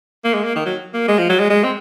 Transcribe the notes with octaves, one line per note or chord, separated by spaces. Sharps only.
A#3
G#3
A#3
D#3
F#3
A#3
G#3
F3
F#3
G#3
G#3
C4